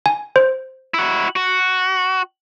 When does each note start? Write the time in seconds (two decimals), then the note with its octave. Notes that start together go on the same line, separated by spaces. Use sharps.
0.06 G#5
0.36 C5
0.94 E4 F#4
1.36 F#4